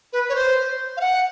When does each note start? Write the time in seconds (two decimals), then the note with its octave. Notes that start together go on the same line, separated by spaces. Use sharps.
0.13 B4
0.29 C#5
0.35 C5
0.97 F5
1.01 F#5